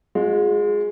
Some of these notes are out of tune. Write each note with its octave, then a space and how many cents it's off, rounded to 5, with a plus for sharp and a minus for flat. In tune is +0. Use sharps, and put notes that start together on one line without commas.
G#3 +0 F4 +45